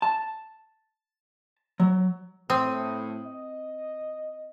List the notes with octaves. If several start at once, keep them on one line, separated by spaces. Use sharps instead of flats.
A5
F#3
A2 C4 D#6
D#5